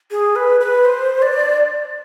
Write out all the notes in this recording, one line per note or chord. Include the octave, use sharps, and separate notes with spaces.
G#4
B4
B4
C5
D5